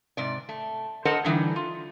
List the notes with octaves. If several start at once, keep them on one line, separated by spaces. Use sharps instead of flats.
G#2 C3 D5
A3
A4 A#4 C5 D#5 F#5
D3 E3 G3 D#4
F4